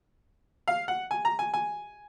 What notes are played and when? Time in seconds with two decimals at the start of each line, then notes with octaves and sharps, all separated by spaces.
0.68 F5
0.88 F#5
1.11 G#5
1.25 A#5
1.39 G#5
1.54 G#5